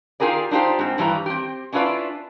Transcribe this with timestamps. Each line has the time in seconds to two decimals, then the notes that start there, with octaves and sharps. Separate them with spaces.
0.20 D#4 F4 G4 G#4 A#4 D5
0.51 D4 D#4 F4 G4 C5
0.79 G#2 C4
0.98 G2 E3 G3 A5 A#5
1.26 C4 G4
1.73 C#4 D4 E4 F4 B4 D5